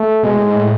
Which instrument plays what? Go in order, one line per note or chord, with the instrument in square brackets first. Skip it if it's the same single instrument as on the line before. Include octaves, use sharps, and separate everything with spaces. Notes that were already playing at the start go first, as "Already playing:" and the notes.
Already playing: [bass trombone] A3
[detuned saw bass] B2 [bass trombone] G#3
[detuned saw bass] A2
G#2
A2